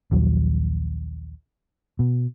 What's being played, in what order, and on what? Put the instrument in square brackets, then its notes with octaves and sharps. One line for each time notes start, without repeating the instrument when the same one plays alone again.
[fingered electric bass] A#1 D#2 F#3
B2